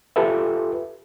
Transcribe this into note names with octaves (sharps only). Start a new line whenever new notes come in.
F4 G4 A4 B4 E5